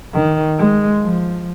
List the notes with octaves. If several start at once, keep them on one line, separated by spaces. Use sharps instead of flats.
D#3
G#3
F3